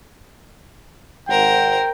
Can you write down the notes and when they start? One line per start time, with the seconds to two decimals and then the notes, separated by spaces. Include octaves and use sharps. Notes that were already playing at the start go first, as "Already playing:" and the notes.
1.29 G#1 G#3 A#4 C5 F#5 G5